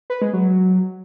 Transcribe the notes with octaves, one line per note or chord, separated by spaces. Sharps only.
B4
G#3
F#3